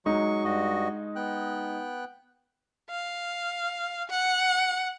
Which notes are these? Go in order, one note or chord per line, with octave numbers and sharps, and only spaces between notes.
F#3 G#3 D#4 C#6
G2 F#4 D#5
B3 G5 F#6
F5
F#5